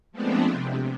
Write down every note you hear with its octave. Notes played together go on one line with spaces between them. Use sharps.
F3 G#3 A3 B3 C4 D4
C3